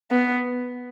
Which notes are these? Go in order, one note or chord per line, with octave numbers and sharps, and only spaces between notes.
B3